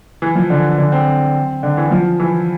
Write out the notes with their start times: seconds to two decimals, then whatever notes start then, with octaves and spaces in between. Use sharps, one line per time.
0.22 E3
0.35 F3
0.50 D3
0.78 D3
0.92 C4
1.63 D3
1.77 E3
1.91 F3
2.20 E3